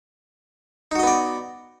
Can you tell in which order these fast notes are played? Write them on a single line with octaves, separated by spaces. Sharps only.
D#4 F#4 D#5 B3 D5